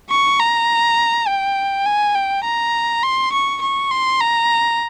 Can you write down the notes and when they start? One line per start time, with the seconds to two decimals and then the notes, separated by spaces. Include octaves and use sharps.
0.11 C#6
0.40 A#5
1.28 G5
1.86 G#5
2.15 G5
2.44 A#5
3.03 C6
3.33 C#6
3.62 C#6
3.91 C6
4.21 A#5